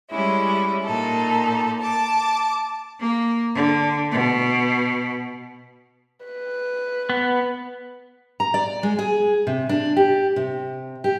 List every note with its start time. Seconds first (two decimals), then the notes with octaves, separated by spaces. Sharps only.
0.10 G3 G#3 C#4 E4
0.85 A#2 D#4 A4
1.80 A5 D6
3.00 A#3
3.54 D3
4.11 B2
6.25 B4
7.10 B3
8.40 A#5
8.54 D5
8.83 G#3
8.99 G#4
9.47 C3
9.69 D4
9.96 G4
10.36 C3
11.04 G4